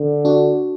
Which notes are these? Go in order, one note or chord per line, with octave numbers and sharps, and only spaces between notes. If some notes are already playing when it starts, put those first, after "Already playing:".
Already playing: D3
D4 F#4